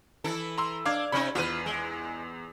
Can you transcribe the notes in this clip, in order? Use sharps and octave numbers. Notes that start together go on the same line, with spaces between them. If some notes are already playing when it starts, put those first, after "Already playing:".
E3 E4 A4
A#5 C6 E6
D4 F5 D6 G#6
C3 C#4 D#4 B5
E2 F4 G4 B4 D#7
G#3